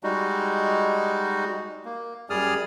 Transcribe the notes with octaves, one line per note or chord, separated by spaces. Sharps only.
G3 G#3 D#4 F#4
A#3
F#2 G3 G#4 D5 D#6 F6